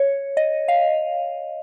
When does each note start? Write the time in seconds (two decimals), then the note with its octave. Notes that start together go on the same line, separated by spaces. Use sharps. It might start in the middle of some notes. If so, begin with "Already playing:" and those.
Already playing: C#5
0.37 D#5
0.68 F5